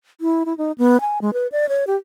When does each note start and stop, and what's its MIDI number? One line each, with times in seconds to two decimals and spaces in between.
0.21 0.43 64
0.46 0.56 64
0.58 0.72 63
0.78 1.00 59
1.01 1.19 80
1.22 1.33 56
1.33 1.47 71
1.52 1.69 74
1.69 1.84 73
1.87 1.96 67